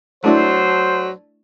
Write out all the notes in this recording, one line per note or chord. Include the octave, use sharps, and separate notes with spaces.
F#3 A3 D4 E4 C5